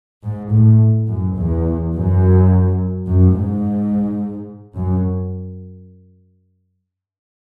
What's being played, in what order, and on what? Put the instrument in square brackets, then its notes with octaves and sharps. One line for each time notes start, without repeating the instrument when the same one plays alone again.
[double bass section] G#2
A2
F#2
E2
F#2
F#2
G#2
F#2